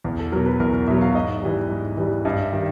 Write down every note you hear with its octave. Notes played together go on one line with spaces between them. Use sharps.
E2
A4
B2 F#3 A#4
B4
E2 A#4
A#4
B2 F#3 E5
F5
G#2 D#5
E3 G3
G#2
E3 G3
G2 D#5
E5
D#3 G3